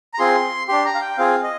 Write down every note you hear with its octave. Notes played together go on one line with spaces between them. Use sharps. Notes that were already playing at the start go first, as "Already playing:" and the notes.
A#5
C4 F4 G#4 C6
D4 G4 C6
A#5
F5
G5
C4 F4 G#4 F5
D#5